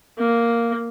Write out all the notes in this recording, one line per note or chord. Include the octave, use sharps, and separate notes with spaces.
A#3